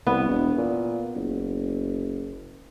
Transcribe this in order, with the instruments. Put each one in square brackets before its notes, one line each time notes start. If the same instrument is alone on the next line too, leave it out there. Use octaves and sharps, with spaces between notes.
[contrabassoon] C2 [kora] B3
[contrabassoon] E1
A#2
F#1